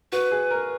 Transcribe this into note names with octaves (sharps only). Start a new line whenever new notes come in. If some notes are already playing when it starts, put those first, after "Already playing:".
F#4 B4
G#4
A#4